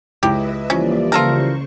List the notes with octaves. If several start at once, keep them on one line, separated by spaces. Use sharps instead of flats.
C#2 E4 G4 B4 D#5 E5
E3 F3 G3 A#3 C#4 D5
C#3 F4 A4 A#4 C5 C#6